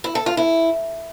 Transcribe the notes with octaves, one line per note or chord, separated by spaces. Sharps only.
E4
A4
F4
E4